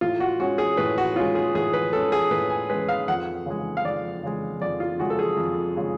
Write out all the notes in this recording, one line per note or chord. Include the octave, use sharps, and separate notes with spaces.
A2 F4
F#4
G#3 C#4 F#4
G#4
A2 B4
F#4
G#3 C#4 F4
G#4
A2 G#4
B4
G#3 C#4 A4
G#4
A2 B4
G#5
G#3 C#4 B4
F5
F2 F#5
C#3 G#3
F5
F2 D5
C#3 G#3
F2 D5
F4
C#3 G#3 F#4
A4
G#4
F2
C#3 G#3